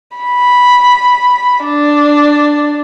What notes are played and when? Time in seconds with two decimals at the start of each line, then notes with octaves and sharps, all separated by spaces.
0.17 B5
1.64 D4